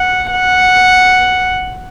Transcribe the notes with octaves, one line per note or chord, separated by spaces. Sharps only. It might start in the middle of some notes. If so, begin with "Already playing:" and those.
Already playing: F#5
F#5